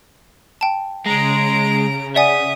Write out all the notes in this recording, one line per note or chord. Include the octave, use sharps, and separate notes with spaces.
G5 A5
C#3 G#3 A#5 D7
D5 E5 F#5 G#5 D#6